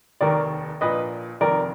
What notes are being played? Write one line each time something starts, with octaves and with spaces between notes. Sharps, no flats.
F1 D#2 D#3 A#4 D5
A#1 A#2 B4 D#5
F1 F2 D#3 A#4 D5